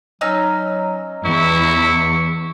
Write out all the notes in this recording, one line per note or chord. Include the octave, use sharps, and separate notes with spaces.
F#3 C#4 D#4 E6
E2 E4 C#6